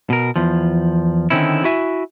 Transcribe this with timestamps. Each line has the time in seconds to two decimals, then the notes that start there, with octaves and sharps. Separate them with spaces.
0.10 B2 A#4
0.36 E2 F3
1.30 D3 D#3 C4 C#4 E4
1.64 E4 F#4 E5 G#5